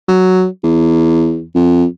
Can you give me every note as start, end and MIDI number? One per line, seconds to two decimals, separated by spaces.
0.08 0.47 54
0.64 1.43 40
1.55 1.85 41